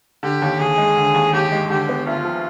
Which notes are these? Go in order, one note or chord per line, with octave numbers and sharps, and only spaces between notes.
D3 G4
D#2
D#2 G#4
G#3
D3
D#2
D#2 G4
G#3
D3 G4
B3
D2 F4
F3